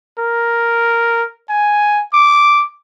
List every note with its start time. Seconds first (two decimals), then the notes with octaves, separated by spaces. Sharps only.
0.19 A#4
1.50 G#5
2.13 D6